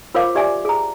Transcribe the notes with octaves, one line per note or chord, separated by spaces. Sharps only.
F4 A#4 C5 C#5 F5 D6
G4 D5 E5 G#5 D6
G#4 A#5